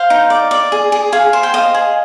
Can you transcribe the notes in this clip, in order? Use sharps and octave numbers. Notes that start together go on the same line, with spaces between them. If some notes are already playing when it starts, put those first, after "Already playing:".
Already playing: C5 F5
D#4
D5
D5
G#4
G#4
G#4 F5
C5
G5
D#5 F5
G#4